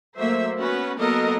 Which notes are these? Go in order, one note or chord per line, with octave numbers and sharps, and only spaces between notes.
F#3 A3 A#3 C5 E5
B3 C#4 F#4 B4
F#3 A#3 B3 A4 A#4 D#5